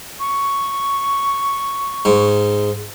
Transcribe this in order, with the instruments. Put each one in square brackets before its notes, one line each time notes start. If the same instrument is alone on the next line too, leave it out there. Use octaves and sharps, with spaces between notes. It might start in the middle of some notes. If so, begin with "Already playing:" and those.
[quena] C#6
[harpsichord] G#2